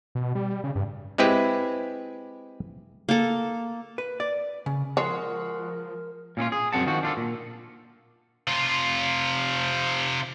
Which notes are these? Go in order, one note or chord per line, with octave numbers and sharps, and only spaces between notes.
B2
G3
C#3
G2
G#3 C4 E4 G4 B4
A#3 A4
B4
D5
C#3
F3 G#3 F#4 A#4 C#5 C6
A#2 C#4 D#4 F4
G#4
F#2 C4 F#5 A5
D#3 F3 F#4
D4 F4 A4
A#2
C3 F4